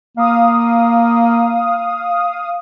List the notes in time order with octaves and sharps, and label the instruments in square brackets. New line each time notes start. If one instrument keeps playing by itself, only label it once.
[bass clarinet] A#3 [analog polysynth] F5 D#6